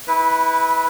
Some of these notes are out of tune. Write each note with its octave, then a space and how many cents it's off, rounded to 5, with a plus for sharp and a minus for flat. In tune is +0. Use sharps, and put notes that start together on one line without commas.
E4 -25 B4 +0